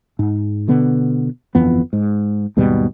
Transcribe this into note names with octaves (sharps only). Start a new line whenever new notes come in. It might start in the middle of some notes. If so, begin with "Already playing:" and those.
G#2
B2 D3 B3
G1 F2 E3 B3
G#2
D#2 G#2 B2 G3